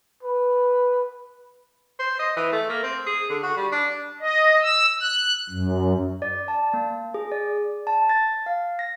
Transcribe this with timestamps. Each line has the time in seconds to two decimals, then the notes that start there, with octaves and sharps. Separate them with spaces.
0.23 B4
1.99 C5
2.19 D#5
2.37 E3
2.53 A3
2.70 A#3
2.83 C4
3.06 G#4
3.30 D3
3.43 F#4
3.57 G3
3.72 D4
4.20 D#5
4.63 E6
5.01 F#6
5.50 F#2
6.22 D5
6.48 A5
6.74 A#3
7.14 G#4
7.32 D5
7.87 A5
8.09 A6
8.46 F5
8.79 A#6